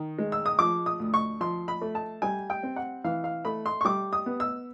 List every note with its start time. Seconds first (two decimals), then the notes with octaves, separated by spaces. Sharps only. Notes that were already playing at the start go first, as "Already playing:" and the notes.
Already playing: D#3
0.19 G#3
0.32 E6
0.46 D#6
0.59 F3 D6
0.86 D#6
1.00 D2
1.14 C#6
1.41 F3 C6
1.68 B5
1.82 A3
1.95 A5
2.22 G3 G#5
2.50 G5
2.63 C4
2.76 F#5
3.04 E3 F5
3.24 F5
3.45 A3 B5
3.66 C6
3.81 C#6
3.85 G3 D6
4.13 D#6
4.26 B3
4.40 E6